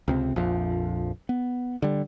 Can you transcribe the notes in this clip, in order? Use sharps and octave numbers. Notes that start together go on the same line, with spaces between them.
C#2 C3 C4
A#1 F2 F3
B3
D3 G3